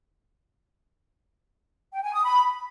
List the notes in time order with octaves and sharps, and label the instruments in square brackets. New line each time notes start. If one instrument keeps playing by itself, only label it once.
[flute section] G5
G#5
D#6
B5